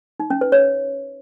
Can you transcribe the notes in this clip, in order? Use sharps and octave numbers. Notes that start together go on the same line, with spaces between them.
D#4
C#4
B4
C#5